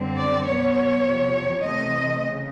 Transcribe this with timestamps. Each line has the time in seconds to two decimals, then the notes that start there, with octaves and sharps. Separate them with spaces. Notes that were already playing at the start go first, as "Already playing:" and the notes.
Already playing: F#2 D3 G3 C4
0.19 D5
0.47 B2 F#3 B3 C#5
1.05 E2 C3 F3
1.63 C3 E3 A3 C4 D#5
2.21 C#3